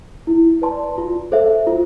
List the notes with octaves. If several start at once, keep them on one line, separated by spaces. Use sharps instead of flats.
E4
B4 D5 A5 C6
F4
A4 C5 E5
F4